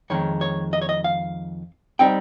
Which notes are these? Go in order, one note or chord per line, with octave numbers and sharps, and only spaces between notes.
F2 D#3 G#3 C#5
C#5
D#5
C#5
D#5
F5
G3 C4 D#4 G5